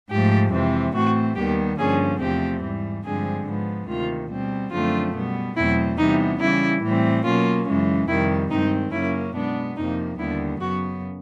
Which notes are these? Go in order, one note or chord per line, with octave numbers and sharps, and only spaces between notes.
G#2 F3 A3 G4
F2 C3 E3 G#3 C4
A2 E3 A3 C4 F#4
D#2 D#3 G3 B3 G4
G2 D3 F3 A#3 C#4 G#4
E2 C3 F3 A3 C4 G4
G#2 E3 G3
G2 D3 F3 G#3 C4 G#4
G#2 F3 G#3 B3
D2 C3 D#3 F4
B2 G3 C4
F#2 D3 F3 A3 C4 F4
B2 G3 B3
E2 B2 F#3 A3 C4 E4
C3 E3 G3 B3 D#4
C#3 E3 G3 E4
A2 E3 G3 C4
B2 F#3 A#3 C#4 F4
F#2 C#3 E3 G#3
F2 C3 D#3 G3 E4
G2 D#3 G#3 C4 D#4
F#2 C#3 F#3 A#3 C#4 E4
B2 G#3 B3 D4
F2 C3 F3 A#3 D#4
D#2 D3 G3 B3 E4
F#2 C#3 F#3 B3 F#4